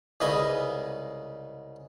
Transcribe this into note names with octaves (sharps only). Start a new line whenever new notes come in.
C2 G#2 C#3 B4 D#5 G#5